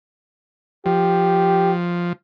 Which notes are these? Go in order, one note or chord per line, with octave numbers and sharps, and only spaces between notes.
F3 G4